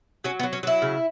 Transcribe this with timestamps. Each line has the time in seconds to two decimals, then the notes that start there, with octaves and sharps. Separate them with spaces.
0.24 F#3 C#4
0.39 B3
0.43 F#3
0.53 C#4
0.63 F#3 E4
0.82 C#3